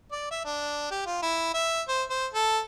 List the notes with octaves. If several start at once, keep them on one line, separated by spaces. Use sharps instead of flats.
D5
E5
D4
G4
F4
E4
E5
C5
C5
A4